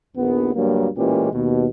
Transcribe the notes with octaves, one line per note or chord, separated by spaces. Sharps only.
A#1 D#2 B3
D2 G2 F#3 A#3
A1 A#2 E3 G#3 C#4 G4
D#2 B2